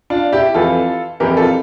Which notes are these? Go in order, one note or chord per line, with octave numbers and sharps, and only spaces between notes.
D4 F4
E4 G4
F2 E3 F4 A4
F2 E3 G4 A#4
F4 A4